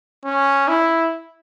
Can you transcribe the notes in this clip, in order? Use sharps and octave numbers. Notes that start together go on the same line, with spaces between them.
C#4
E4